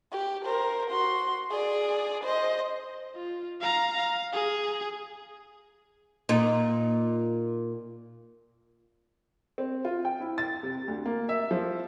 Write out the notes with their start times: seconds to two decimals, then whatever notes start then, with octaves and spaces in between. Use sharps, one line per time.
0.12 G4
0.45 A#4 C5
0.91 F#4 C6
1.50 G#4 D5
2.24 C5 D#5
3.15 F4
3.61 F5 A#5
3.97 F5
4.33 G#4
6.29 A#2 D#4
9.58 C4
9.85 F4
10.05 G5
10.20 E4
10.38 A6
10.63 C3
10.88 D2
11.05 A#3
11.29 E5
11.51 F3